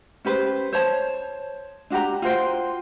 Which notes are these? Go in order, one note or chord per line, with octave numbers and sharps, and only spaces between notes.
C#4 G4 B4 C5
C5 C#5 A5
D4 F#4 G4 A#5
F4 F#4 C5 G5